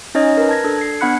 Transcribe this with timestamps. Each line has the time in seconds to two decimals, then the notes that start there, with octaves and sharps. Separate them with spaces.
0.15 C#4 D#4 C#5 D#5 G#5
0.37 A#4 B4
0.49 A5 G#6 A#6
0.64 D4 A4
0.78 G#6 C7
1.00 B3 D4 F#5 B5 F#6 C#7